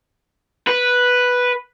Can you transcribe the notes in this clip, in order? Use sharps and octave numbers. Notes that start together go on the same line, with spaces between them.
B4